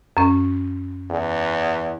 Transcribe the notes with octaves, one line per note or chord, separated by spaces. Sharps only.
F#2 C#4
E2